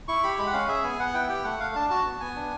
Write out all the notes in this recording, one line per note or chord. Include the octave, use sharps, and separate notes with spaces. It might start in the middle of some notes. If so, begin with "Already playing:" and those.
E4 C#6
G4 B5
G#3 B5
F#5
C#4 F5
G#4 E5
B3 G#5
B3 F#5
E4 G5
G4 G5
A3 F#5
A3 F5
D4 A5
F#4 A5
B3
B3 G#5
D4